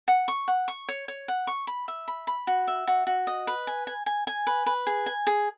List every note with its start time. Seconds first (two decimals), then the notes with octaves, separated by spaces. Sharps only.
0.08 F#5
0.28 C#6
0.48 F#5
0.68 C#6
0.89 C#5
1.08 C#5
1.28 F#5
1.47 C#6
1.67 B5
1.88 E5
2.08 B5
2.27 B5
2.47 F#4
2.68 E5
2.87 F#4
3.07 F#4
3.27 D#5
3.47 B4
3.67 G#5
3.87 G#5
4.06 G#5
4.27 G#5
4.47 B4
4.66 B4
4.87 G#4
5.06 G#5
5.27 G#4